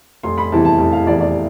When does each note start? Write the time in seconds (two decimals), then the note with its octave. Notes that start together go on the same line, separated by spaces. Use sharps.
0.23 F1 C6
0.38 B5
0.52 E2 C3 E3 A5
0.65 A5
0.79 F1
0.92 F5
1.07 E2 C3 E3 D5
1.20 D5